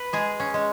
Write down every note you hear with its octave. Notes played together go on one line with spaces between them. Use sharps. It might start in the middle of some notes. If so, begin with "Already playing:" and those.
Already playing: B4
G#3 G#4
C#4
G#3